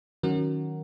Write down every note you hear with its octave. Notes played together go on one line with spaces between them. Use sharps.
D#3 F#3 C#4 F#4 A#4